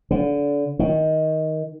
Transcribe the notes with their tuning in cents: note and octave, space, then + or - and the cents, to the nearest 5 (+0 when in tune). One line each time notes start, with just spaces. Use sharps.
D3 -30
D#3 +15